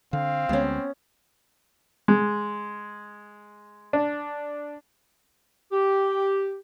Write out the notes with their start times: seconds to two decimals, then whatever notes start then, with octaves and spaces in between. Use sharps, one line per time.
0.13 D3 C4 F5
0.49 D2 G#3 B3 C#4
2.08 G#3
3.93 D4
5.72 G4